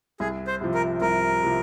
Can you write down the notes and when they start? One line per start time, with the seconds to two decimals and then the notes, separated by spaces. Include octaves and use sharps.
0.20 C2 G#4
0.47 C5
0.61 C3 F3
0.74 A#4
1.01 C2 A#4
1.43 C3 F3